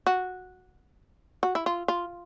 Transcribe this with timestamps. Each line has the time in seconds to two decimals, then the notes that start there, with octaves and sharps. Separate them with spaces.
0.07 F#4
1.43 F#4
1.55 E4
1.66 F4
1.88 F4